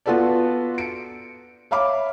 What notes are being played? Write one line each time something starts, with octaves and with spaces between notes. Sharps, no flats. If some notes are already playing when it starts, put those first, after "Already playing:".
B3 F4 F#4 A4 B4 D5
C#7 D7
C#5 E5 F5 B5 D6